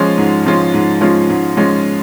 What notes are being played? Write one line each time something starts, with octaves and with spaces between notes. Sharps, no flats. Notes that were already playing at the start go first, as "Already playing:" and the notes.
Already playing: F3 G#3 C#4 F4
G#2
F3 G#3 C#4 F4
G#2
F3 G#3 C#4 F4
G#2
F3 G#3 C#4 F4